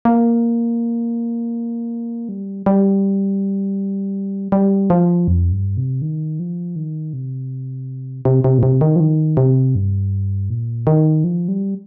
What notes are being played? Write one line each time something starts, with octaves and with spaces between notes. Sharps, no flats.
A#3
G3
G3
G3
F3
F2
G2
C3
D#3
F3
D#3
C3
C3
C3
A#2
C3
D#3
F3
D#3
C3
G2
A#2
D#3
F3
G3